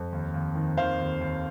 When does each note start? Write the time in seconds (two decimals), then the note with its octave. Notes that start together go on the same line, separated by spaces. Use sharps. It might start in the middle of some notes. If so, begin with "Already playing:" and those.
Already playing: F2
0.12 D#2
0.34 D#2
0.55 D#3
0.77 D#3 C5 F5
0.99 D#2
1.21 D#2